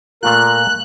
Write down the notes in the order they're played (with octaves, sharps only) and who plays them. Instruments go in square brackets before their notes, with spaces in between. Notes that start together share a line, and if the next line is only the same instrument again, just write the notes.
[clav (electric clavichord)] A#2 A3 F4 [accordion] A#4 [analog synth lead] F#6